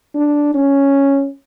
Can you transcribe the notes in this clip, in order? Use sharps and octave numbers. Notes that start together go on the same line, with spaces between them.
D4
C#4